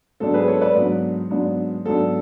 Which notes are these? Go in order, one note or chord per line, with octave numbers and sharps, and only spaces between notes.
G#2 F#3 B3 D4 A4
G#4 B4
A4 C#5
B4 D5
G#2 F#3 B3 D4
G#2 F#3 B3 D4
G#2 F#3 B3 D4 A4